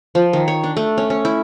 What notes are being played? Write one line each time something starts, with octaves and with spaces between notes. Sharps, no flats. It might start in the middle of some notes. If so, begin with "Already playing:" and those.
F3
D#3
C#5
D4
A3
C#4
C#4
E4